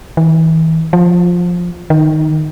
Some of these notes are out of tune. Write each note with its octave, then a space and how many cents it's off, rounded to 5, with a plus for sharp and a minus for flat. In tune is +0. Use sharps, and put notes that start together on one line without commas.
E3 -40
F3 +10
D#3 -5